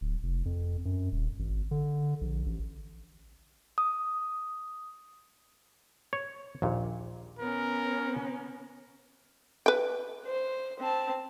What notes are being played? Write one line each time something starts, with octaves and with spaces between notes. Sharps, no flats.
D1
F1
F2
F#2
D#1
G#1
D3
A#1
A1
D#6
C#5
A#1 D#2 A#2
B3 C#4 A#4
B4 G5
C5
C4 A5